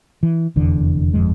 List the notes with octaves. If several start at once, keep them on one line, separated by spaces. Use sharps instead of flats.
E3
F1 E2 D3
G1 F2 G#3